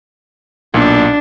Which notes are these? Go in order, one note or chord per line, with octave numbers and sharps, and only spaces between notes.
B1 A#2 D4